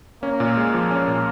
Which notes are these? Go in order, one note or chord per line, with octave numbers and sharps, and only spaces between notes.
A#3 C#4
A#2
G#3
F3
C#4
A#2